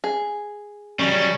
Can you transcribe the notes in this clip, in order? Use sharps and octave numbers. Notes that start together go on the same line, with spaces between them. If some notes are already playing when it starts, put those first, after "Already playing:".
G#4
C#3 F#3 G3 C#4